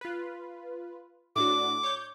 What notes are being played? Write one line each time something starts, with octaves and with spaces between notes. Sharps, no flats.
F4 B4
A2 D4 F#4 D6
C#5 G6